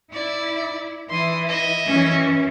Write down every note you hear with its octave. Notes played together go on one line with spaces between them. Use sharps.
E4 D5
E3 E4 C6 D#6
D#5 E5
F#2 E3 C#4